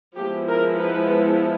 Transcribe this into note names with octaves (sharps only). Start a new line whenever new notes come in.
F3 G#3 B3 E4 G4
A#4
B4